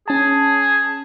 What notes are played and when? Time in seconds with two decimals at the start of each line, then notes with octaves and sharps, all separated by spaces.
0.08 C#4 G#4 A5